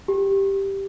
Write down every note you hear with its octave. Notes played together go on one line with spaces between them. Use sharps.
G4